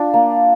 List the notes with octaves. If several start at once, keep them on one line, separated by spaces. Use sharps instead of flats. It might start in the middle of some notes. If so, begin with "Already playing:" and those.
Already playing: D4 F4
A#3